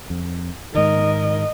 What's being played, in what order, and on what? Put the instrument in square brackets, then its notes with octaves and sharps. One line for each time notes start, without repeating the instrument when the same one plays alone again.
[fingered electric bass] F2
[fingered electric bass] G#2 D#3 [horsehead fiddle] A#4 D#5